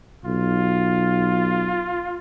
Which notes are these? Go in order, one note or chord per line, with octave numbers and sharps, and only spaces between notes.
B1 F4